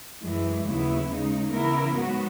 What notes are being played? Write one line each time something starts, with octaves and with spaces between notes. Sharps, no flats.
F#2 E3 G#3
D#2 C#3 F#3 B3 E4
C#3 G#3 D#4
C#3 E3 B3 E4 A#4
G#2 F#3 B3 F#4